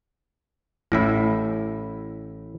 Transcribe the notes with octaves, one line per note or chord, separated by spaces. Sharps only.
A1 A2 E4 E5 B5